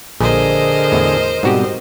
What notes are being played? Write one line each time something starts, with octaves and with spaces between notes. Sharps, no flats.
A#1 A#2 D3 G#4 A#4 C5 D#5
E2 A2
G#2 B2 G3 C4 F#4 G4